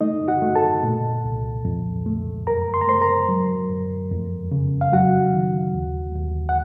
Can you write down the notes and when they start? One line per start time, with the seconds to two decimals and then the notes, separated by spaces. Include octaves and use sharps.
0.01 A3 D#4 D#5
0.28 F#4 F#5
0.42 A3
0.55 A4 A5
0.83 A#2
1.24 C2
1.65 F2
2.06 A3
2.46 F#2 A#4 A#5
2.74 C6
2.81 A#5
2.88 A3 C5 C6
3.01 A#4 A#5
3.29 F#3
3.70 F#2
4.11 F2
4.51 C#3
4.81 F5
4.92 F#3 F#4 F#5
5.34 D#3
5.74 D#2
6.15 D#2
6.49 F#5